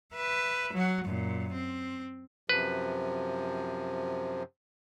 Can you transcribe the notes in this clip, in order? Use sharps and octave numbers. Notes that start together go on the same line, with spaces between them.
B4 E5
F#3 F#4
F#2 A#2
C4
F#2 C3 F3 B4